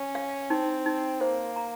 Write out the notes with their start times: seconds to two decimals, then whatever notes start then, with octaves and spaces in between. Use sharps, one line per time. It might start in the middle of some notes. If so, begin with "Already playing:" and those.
Already playing: C#4
0.15 F5
0.50 C4 D#4
0.86 D#4
1.21 A#3 C5
1.56 A#5